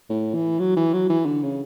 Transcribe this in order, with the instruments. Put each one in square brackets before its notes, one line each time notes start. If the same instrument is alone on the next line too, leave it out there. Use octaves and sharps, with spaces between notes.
[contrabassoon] A2
E3
F#3
E3
F#3
E3
D3
C#3